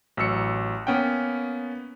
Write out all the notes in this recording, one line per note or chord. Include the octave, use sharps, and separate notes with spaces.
A1 F#3 E6 C#7
A#3 B3 C#4 F#5 G5